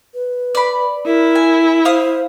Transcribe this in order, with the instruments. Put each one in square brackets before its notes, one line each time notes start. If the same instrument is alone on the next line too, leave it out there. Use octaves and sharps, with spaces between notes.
[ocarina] B4
[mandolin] D5 B5
[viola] E4 [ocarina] A#4
[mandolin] G#5
[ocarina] C5 [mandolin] F5 D#6